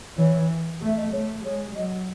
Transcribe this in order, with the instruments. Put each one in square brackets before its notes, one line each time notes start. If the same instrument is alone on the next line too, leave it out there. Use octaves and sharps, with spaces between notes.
[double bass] E3 [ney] C#5
[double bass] A3 [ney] E5
[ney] D#5
[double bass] A3 [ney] C#5
[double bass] G#3 [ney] C#5
[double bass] F#3 [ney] D#5